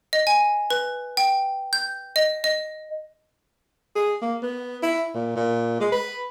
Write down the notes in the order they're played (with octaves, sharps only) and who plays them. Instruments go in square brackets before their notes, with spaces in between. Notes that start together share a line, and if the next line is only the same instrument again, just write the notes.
[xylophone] D#5
G#5
B4
G5
G6
D#5
D#5
[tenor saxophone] G#4
A#3
B3
E4
A#2
A#2
G#3
B4